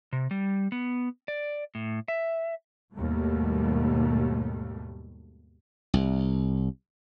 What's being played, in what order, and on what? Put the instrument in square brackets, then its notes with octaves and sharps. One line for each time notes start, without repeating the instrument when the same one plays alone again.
[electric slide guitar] C3
G3
B3
D5
A2
E5
[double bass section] D#2 G#2 B2 G3 A3
[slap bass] C2